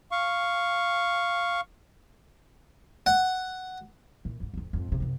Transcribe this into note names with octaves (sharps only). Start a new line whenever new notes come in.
F5 C#6
F#5
A#2 E3
D2 G#2
D1 F2
F2 G#2
D#1 C3
F#2 C3